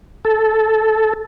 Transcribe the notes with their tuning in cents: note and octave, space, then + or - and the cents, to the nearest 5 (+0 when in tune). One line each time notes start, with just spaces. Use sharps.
A4 -10